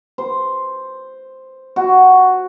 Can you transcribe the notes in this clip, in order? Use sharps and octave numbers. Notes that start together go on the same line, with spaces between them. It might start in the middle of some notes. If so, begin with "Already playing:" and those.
C5
F#4